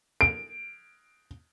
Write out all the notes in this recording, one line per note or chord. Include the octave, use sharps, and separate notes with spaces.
D7